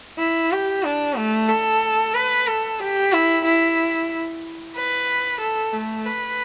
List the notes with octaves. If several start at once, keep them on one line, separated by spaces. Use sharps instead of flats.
E4
G4
D4
A3
A4
B4
A4
G4
E4
E4
B4
A4
A3
B4